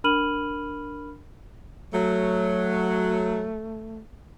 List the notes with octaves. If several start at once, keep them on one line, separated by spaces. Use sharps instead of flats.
D4 A#4 B5 F6 D#7 F#7
F#3 A3